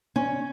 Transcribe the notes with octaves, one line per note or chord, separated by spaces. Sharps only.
C#4